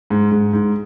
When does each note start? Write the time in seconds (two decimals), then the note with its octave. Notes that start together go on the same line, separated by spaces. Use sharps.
0.10 G#2
0.32 G#2
0.53 G#2